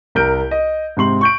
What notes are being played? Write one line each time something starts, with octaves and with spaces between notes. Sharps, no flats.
C2 A#4 G6 D7
D#5
G#2 C3 C6 F#7
C#6 G6 D7